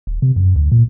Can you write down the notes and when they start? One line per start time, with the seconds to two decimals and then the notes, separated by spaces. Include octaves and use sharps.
0.07 D#1
0.22 C3
0.36 F#2
0.56 D2
0.72 A#2